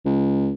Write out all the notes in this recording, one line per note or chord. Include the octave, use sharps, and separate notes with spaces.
C#2